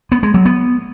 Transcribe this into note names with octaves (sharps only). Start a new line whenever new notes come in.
B3
G#3
F#3
B3